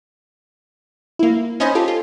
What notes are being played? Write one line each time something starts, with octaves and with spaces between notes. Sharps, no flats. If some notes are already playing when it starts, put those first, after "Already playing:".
A#3 E4
C#4 D#4 C5 D#5 G#5 B5
F4 G4 A4
F4